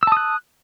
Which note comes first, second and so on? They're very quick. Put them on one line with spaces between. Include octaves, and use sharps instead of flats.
E6 A5 D#6 F#6